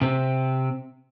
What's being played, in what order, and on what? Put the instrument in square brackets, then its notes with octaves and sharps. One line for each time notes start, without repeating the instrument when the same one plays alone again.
[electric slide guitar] C3 C4